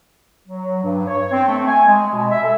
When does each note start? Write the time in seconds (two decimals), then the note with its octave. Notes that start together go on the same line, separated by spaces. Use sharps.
0.48 F#3
0.83 G2
1.07 C#5
1.32 C4
1.47 A3
1.67 G#5
1.87 G#3
2.12 B2
2.31 E5
2.43 A4